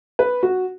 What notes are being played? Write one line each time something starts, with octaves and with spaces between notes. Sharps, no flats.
B4
F#4